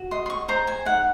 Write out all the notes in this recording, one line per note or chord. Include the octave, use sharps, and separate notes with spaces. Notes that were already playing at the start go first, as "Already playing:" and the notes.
Already playing: F#4
D#5 C6
C6
C#6
C5 A#5
G#5
D#4 F#5